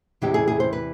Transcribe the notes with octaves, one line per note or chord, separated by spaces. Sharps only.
E2 C3 E3 G#3 C4 G4
G#4
G#4
C5
B4